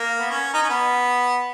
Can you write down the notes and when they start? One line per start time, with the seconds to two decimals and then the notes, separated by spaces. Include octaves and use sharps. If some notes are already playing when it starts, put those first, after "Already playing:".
Already playing: A#3
0.19 B3
0.30 C#4
0.54 D#4
0.62 C#4
0.70 B3